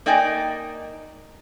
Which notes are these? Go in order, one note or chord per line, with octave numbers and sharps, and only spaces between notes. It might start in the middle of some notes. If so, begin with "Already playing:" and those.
A#3 D#4 D5 D#5 G5 G#5